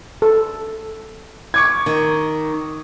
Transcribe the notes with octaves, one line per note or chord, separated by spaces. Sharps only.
A4
C#6 D6 G#6
D#3